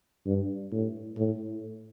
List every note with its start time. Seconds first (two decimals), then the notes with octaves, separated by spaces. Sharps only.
0.26 G2
0.72 A2
1.17 A2